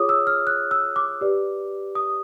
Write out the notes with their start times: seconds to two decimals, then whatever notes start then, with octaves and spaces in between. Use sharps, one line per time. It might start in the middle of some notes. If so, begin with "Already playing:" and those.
Already playing: F4 G#4 C#5 D6 D#6
0.09 E6
0.27 F6
0.47 F#6
0.71 E6
0.96 D6
1.21 G4 B4 D5
1.95 D#6